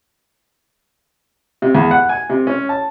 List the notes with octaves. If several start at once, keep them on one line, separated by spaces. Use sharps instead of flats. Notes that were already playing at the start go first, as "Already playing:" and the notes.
C3
E2
F#5
G#5
C3
C#4
A5